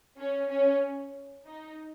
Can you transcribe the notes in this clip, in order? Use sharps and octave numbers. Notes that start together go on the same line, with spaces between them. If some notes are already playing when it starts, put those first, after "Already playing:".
C#4
C#4
D#4